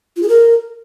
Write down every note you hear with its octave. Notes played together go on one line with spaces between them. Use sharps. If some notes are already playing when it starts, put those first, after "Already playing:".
F4
G#4
A#4